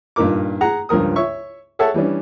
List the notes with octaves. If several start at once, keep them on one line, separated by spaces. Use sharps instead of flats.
G2 A#2 D#4 A#4 D6
G#4 F#5 A#5
C#2 G2 F3 A#4 D#6
C#5 E5 C#6
G#4 A4 C#5 E5 F#5 A5
E3 G3 C#4 D4